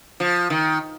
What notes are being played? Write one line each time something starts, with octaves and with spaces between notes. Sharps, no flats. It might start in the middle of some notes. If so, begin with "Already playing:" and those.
F3
D#3